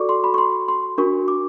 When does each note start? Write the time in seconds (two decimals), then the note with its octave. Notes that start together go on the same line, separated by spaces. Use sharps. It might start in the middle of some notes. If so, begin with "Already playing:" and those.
Already playing: F#4 A4 D5 C#6 D6
0.09 C6
0.24 B5
0.34 C#6
0.38 C6
0.68 C6
0.98 D4 F#4 A#4 C#6
1.28 D6